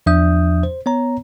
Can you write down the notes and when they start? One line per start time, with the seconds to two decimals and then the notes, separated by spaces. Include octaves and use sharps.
0.06 E2 F3 D4 E5 D#6 G6
0.63 C5
0.86 B3 C#5 A#5